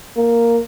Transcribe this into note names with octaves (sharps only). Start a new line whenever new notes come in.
A#3